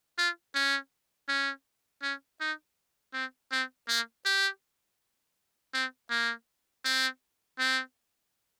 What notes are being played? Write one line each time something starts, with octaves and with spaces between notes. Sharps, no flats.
F4
C#4
C#4
C#4
D#4
C4
C4
A#3
G4
C4
A#3
C4
C4